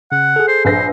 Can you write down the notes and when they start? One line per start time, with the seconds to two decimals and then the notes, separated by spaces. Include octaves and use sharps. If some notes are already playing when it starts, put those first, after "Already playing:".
0.12 C#3 F#5
0.36 G#4 A4
0.48 C5
0.65 A#1 B4 C5 A#6